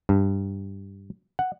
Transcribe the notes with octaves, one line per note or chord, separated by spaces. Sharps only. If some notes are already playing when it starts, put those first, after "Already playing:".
G2
F#5